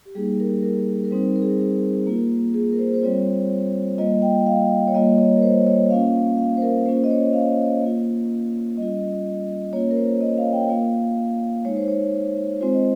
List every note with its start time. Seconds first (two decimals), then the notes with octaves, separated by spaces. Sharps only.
0.06 G4
0.15 G3 A#3 D#4 G#4
0.40 A#4
0.63 A#4
1.05 A#4
1.11 G3 C4 D#4 C5
1.36 A#4
1.42 G#4
1.49 A#4
1.59 G#4
2.07 A#3 F4
2.54 G#4
2.73 A#4
2.79 C5
2.94 C5
3.02 G3 C4 F4 C#5
3.98 G3 A#3 F4 D#5
4.22 G5
4.46 F5
4.87 C#5
4.94 G3 A#3 F4 D#5
5.18 C#5
5.36 A#4
5.42 C5
5.67 C#5
5.90 A#3 C#4 F4 F5
6.38 F5
6.57 C5
6.62 A#4
6.86 A#3 C#4 F4 C5
7.04 D#5
7.11 C#5
7.33 F5
7.82 A#3 F4
8.77 G3 C#4 F4 D#5
9.73 A#3 C#4 F4 C#5
9.91 A#4
9.97 C5
10.21 D#5
10.38 F5
10.53 G5
10.69 A#3 F4 F5
11.65 G#3 D#4 C#5
11.77 C5
11.88 C#5
12.61 G#3 C4 F4 C5
12.74 D#5